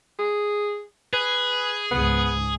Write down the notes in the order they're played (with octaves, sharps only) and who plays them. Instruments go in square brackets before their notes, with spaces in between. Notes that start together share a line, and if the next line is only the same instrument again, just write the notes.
[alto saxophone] G#4
[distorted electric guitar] G#4 [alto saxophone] B4
[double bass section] C#2 G#2 [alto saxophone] B3